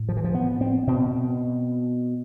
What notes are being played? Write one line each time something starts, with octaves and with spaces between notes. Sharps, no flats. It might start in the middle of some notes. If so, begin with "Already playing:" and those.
Already playing: A2
F3
E3
F3
B3
C4
B2 C4